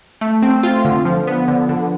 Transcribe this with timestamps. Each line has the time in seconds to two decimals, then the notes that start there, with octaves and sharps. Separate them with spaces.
0.21 A3
0.42 C4
0.63 F4
0.85 D3
1.05 F3
1.27 B3
1.48 D3
1.69 D3